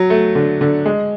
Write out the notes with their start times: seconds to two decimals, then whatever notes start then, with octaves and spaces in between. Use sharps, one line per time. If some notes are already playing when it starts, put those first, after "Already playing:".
Already playing: F#3
0.10 A3
0.35 D3
0.61 D3
0.86 G#3